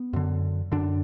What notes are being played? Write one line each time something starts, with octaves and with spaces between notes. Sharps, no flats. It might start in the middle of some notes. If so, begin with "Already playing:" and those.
Already playing: B3
F#2 D3
F#2 D3 D4